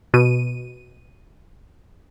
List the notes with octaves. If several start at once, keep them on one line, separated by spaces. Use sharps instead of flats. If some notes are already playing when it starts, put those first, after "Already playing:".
B2 D#7